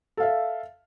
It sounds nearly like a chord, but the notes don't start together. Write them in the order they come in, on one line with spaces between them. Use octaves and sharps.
A4 F5 E5